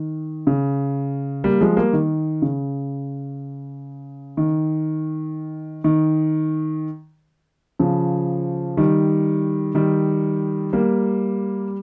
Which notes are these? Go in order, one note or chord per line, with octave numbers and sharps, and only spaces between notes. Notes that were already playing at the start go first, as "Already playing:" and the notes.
Already playing: D#3
C#3
G3 A#3
F3 G#3
G3 A#3
D#3
C#3
D#3
D#3
C#3 F3
D#3 G3
D#3 G3
G3 A#3